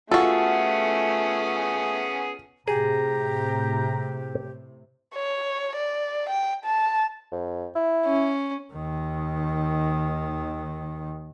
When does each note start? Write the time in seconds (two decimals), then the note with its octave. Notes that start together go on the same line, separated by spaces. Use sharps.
0.11 A3 B3 C#4 F4 F#4 G#4 A4
2.68 A2 C3 G4 G#4 A#5
5.15 C#5
5.76 D5
6.30 G5
6.65 A5
7.31 F2
7.75 E4
8.06 C#4
8.73 D#2 D#3